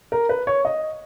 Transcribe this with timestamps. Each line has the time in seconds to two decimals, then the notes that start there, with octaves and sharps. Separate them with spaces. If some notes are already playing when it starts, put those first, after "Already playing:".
0.12 A#4
0.29 B4
0.47 C#5
0.65 D#5